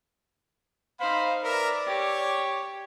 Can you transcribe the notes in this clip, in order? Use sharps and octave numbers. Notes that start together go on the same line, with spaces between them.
D#4 C5 F5 B5
A#4 B4 D5 E5
G4 C#5